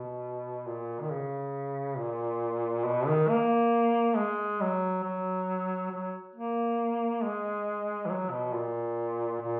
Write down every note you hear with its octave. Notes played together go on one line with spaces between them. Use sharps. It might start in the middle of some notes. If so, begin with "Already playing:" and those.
Already playing: B2
A#2
D#3
C#3
A#2
B2
D#3
A#3
G#3
F#3
F#3
F#3
A#3
G#3
E3
F#3
B2
A#2
A#2